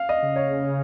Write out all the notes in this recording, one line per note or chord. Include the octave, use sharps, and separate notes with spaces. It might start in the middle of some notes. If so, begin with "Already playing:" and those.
Already playing: F5
D#5
C#3
C#5